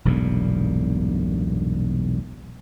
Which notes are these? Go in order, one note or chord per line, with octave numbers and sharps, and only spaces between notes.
E1 B1 G2 A#2